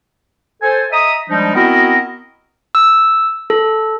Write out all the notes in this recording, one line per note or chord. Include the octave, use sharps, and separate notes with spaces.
A4 C5 G#5
D#5 E5 A#5 D#6
F3 G3 G#3 D4 D#4
B3 C4 E4 F#4 A#4 D#5
E6
A4